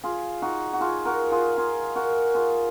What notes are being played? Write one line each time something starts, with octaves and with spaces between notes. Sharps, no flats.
F4 G#4
D#4 F#4
F#4
F4 G#4
F#4 A#4
F4 G#4
F4 G#4
F#4 A#4
F4 G#4